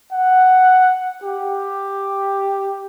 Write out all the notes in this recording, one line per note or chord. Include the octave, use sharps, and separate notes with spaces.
F#5
G4